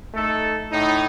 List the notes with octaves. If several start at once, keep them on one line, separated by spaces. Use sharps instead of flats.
A3 D#4 A4
A2 D#4